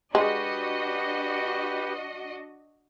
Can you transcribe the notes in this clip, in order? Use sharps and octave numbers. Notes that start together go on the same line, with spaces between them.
G#3 D4 F#4 G4 B4 D#5